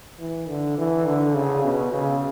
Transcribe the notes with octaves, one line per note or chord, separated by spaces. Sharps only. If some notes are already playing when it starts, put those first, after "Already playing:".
E3
D3
E3
D3
C#3
B2
C#3